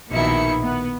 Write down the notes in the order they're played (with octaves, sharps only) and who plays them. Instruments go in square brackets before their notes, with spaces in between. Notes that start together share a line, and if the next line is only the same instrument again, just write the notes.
[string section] A#1 B2 D#3 D#4 E4 C#7
B3